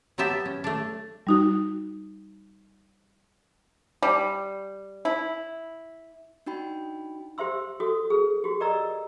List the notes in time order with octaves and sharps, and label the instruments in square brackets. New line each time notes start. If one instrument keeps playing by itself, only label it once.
[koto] F#3 B3 F#4 G4 E5 A5
C#4
A3 D4
[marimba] G3 D#4 F#4
[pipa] G3
E4
[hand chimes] D4 D#4 F#4 G5 B5
[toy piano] G4 C5 E5 C6 E6
F#4 A4 D#6
G#4 B4
F#4 G4
G4 A#4 D5 D#5 A#5 E6